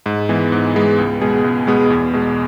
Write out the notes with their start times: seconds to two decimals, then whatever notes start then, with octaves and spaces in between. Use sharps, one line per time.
0.06 G#2
0.29 E3 G#3 B3
0.52 G#2
0.74 E3 G#3 B3
0.98 C#2
1.21 B2 G#3 B3 G#4
1.44 C#2
1.67 B2 G#3 B3 G#4
1.90 E2
2.13 B2 G#3